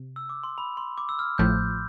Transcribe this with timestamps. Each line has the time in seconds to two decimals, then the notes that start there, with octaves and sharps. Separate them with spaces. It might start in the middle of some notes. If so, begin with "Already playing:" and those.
Already playing: C3
0.16 E6
0.29 D6
0.43 C6
0.58 B5
0.77 C6
0.98 D6
1.09 E6
1.19 F6
1.38 A1 A2 F3 A3 G6